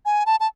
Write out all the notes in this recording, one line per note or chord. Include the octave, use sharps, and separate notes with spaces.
G#5
A5
A5